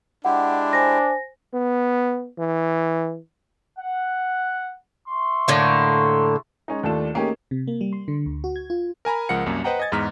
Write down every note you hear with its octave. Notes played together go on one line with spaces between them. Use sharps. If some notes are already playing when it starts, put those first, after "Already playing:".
G#3 D4 E4 G4 F#5
C5 G#5 A#6
B3
E3
F#5
E5 C6 C#6
A2 D3 A#3
G#3 C#4 D#4
D#2 A3 D4 F4 A4 E7
A3 A#3 C#4 D#4 G4 G#4
C3
A#3
G3
C6
D3
D2
F#4
G#6
F4
A#4 G#5 A#5 B5
C#2 F3 A#4 F#5 C#7
C2 F#2 A#3
B4 C5 D#5 F#5 G5 A#5
D#5 G#5 G#6 A6
E2 G#2 D#5 A#5 F6 B6